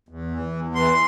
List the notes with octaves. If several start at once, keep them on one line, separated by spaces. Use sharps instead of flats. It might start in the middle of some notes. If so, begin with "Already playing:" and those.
E2
E3
E2
E3 C6